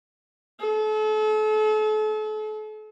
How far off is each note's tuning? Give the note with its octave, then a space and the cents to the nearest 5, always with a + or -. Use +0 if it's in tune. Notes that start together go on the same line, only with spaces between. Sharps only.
A4 -40